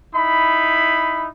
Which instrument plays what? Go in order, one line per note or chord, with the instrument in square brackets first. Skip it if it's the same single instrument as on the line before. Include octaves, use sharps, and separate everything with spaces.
[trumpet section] D#4 E4 B5